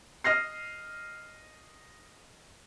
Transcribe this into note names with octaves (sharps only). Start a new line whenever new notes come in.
D#5 F6 A#6 C7